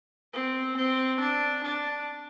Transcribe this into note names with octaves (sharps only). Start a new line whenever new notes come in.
C4
C4
D4
D4